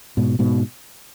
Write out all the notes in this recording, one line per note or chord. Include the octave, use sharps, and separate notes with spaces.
G#2 B2
G#2 B2